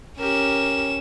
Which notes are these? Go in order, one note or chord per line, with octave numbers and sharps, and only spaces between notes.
C#4 G4 A#4 E7